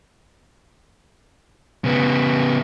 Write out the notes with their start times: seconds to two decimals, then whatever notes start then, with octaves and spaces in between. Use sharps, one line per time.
1.84 C#3 B3